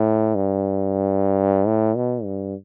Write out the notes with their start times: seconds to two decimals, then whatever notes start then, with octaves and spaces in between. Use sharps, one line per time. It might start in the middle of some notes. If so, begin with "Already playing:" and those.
Already playing: A2
0.35 G2
1.67 A2
1.96 B2
2.24 G2